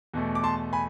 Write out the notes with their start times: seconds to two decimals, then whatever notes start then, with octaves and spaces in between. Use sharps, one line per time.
0.14 E2 B2 A3
0.35 D6
0.43 A5 C6
0.73 G#5 B5